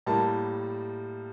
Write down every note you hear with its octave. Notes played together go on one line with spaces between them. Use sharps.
A2 G3 A#3 A5